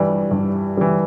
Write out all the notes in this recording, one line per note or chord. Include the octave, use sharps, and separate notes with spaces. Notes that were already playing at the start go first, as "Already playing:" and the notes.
Already playing: G2 E3 G3
G2
E3 G3